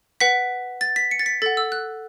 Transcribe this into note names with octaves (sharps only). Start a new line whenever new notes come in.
B4 F#5 B6
A6
B6
C#7
A6
B6
A4 F#5 A6
E6
F#6